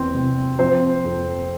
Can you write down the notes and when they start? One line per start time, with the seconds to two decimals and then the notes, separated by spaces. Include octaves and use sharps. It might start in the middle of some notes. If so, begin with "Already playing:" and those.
Already playing: E2 C4
0.14 C3
0.59 F3 C4 C5
1.05 F2